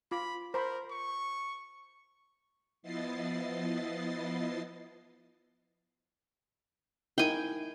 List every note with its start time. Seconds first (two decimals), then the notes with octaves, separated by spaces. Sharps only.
0.11 F4 B5 D6
0.54 A#4 C5 A#5 B5
0.91 C#6
2.82 F3 B3 E4 D#5 A6 C7
7.18 D#4 E4 A#4 G5 G#5